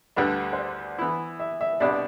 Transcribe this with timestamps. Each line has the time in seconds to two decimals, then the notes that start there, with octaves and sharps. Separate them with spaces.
0.16 D2 D3 G3 D4 B4
0.53 C5
0.57 D5
0.99 E3 B3 E4
1.40 E5
1.61 E5
1.80 C2 B2 B3 D4 G4 D5